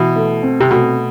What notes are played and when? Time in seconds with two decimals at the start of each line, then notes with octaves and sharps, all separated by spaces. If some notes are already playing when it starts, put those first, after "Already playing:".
Already playing: B2 E3
0.16 A3
0.43 C4
0.60 C3
0.71 B2 A3